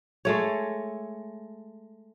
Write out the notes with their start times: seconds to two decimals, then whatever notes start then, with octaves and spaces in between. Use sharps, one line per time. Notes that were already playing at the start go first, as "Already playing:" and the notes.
0.25 G#3 A3 C#5